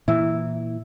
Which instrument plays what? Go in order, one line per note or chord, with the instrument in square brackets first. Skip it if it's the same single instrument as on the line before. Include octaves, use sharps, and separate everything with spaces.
[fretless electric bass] A#2 E3 [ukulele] E4